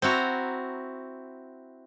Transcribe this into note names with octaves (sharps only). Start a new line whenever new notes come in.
C4 E4 F#4 A#5